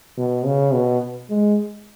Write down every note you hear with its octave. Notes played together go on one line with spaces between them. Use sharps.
B2
C#3
B2
G#3